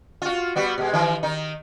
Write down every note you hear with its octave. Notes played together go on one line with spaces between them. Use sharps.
F4 F#4
G3 B3 F#4
B2 G#3
D#3 E3
D#3 D#4